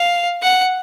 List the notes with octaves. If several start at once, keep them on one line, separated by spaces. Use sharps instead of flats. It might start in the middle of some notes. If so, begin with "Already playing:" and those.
Already playing: F5
F#5